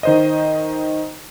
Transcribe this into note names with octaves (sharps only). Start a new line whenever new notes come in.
D#3 C5 D#5